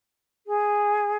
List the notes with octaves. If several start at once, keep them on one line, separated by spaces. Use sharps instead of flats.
G#4